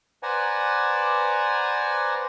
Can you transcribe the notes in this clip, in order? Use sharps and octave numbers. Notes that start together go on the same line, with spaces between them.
B4 C5 D5 F#5 G#5 A#5